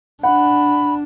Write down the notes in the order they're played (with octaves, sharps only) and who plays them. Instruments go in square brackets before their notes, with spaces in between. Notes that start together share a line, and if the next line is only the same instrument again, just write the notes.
[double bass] D4 [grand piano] F#5 [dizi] B5